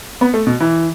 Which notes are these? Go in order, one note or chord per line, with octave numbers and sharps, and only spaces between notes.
B3
A3
B2
E3